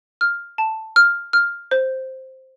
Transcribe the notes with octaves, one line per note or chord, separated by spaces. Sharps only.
F6
A5
F6
F6
C5